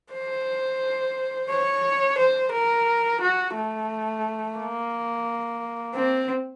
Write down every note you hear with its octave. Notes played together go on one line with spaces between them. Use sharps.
C5
C#5
C5
A#4
F#4
A3
A#3
C4